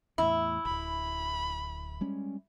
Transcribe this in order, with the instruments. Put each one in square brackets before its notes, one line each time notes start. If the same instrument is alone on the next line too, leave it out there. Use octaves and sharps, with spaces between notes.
[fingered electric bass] E2 A2 [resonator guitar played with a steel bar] E4
[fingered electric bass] D1 G#1 [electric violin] B5
[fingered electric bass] G3 G#3 C#4